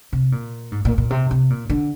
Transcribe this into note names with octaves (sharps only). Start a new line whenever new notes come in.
C3
A#2
G#2
A#2
A#2
C3
C3
A#2
D3